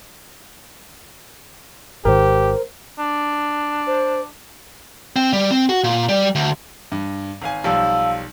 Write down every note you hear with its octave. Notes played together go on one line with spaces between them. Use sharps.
G#1 G#2 D#3 G4 A#4 C5
D4
C5
C4
G3
C4
F#4
A#2
G3
D2
G2
G#1 F5 G#5
B1 F3 G3 F5 A5 E6